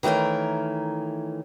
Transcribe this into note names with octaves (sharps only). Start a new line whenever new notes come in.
D#3 E3 A3 C#4 A#4